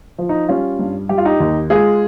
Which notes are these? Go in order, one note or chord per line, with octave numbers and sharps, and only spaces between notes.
F3
D#4
G3 C#4 F4
G2
G3 G4
F4
D#4 G4
D#2
G#3 F4 G#4